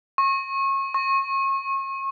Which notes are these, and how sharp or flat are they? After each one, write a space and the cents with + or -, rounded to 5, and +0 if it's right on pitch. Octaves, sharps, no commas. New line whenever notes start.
C#6 -30
C#6 -35